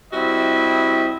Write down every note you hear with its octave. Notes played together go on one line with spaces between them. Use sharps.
G3 C4 E4 F#4 D#5 E5